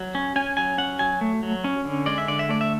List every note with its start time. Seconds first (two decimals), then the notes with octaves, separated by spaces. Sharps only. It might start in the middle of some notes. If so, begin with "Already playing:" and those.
Already playing: F#3
0.15 C#4
0.36 C#4 G#5
0.57 F#3 G#5
0.78 C#4 F#5
0.99 F#3 G#5
1.21 A3
1.43 F#3
1.64 C#4
1.85 D3
2.06 G#3 D5
2.18 E5
2.28 D3 D5
2.39 E5
2.49 A3 D5
2.61 E5